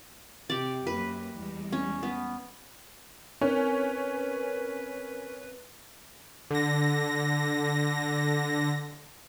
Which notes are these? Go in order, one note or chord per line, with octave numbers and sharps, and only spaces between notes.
C3 G4 D5
F#2 A#3 B4
E2 G3 G#3
C#4
B3
C4 C#4 A#4 B4
D3 A#6